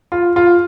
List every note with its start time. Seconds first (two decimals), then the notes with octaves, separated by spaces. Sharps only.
0.12 F4
0.36 F4